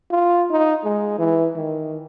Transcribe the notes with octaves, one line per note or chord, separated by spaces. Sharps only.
F4
D#4
G#3
E3
D#3